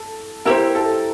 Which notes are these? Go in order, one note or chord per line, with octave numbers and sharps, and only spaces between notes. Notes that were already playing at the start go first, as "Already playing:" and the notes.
Already playing: A4
E4 G4 A#4 C5
A4